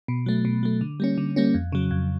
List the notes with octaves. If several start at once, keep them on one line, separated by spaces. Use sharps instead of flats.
B2
F#3 A3
B2
F#3 A3
D3
G3 A#3 C#4
D3
G3 A#3 C#4
F2
C#3 F#3
F2